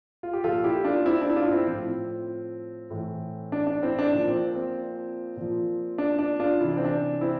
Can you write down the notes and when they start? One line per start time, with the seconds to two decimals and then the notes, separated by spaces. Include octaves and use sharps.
0.23 F4
0.33 G4
0.44 A#2 F3 F4 A4
0.64 E4 G4
0.85 D4 F4
1.05 C4 E4
1.21 D4
1.30 E4
1.36 D4 F4
1.51 C4 E4
1.67 A2 F3 C4
2.90 A2 E3
3.52 D4
3.67 D4
3.83 C4 E4
3.99 D4
4.13 A#2 F3 D4
4.28 C4
4.55 C4
5.37 A#2 F3
5.98 D4
6.19 D4
6.40 D4 F4
6.60 C3 E3 E4
6.68 D4
6.77 C4
6.85 D4
7.21 C4 E4